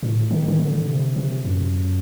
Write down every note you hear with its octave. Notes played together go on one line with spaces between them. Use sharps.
A2
D#3
D#3
D3
C3
C3
F#2